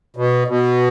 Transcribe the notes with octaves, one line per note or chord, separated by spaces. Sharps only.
B2
B2